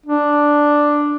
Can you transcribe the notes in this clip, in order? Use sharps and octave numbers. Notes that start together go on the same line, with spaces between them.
D4